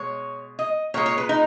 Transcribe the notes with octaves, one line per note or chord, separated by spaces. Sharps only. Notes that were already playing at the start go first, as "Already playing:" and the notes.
Already playing: B2 G#3 C#5
D#5
A#2 G#3 C#5
C#5
B4
D#4